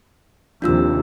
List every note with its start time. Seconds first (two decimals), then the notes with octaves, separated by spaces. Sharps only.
0.62 D#2 C3 F3 D4 F4 E6